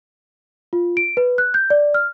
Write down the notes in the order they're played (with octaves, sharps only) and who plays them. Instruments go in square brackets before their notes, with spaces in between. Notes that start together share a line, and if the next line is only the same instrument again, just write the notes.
[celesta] F4
D7
B4
F#6
G6
D5
F6